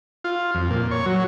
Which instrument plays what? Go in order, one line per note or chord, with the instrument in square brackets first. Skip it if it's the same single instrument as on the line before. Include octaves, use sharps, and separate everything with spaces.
[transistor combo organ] F4
F2
A#2
C#5
F#3